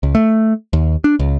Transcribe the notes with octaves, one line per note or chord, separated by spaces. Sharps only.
C#2
A3
D#2
D4
C#2